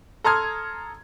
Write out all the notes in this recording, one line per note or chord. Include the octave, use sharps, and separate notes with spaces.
A4 A#5 C6 D#6 F6 G#6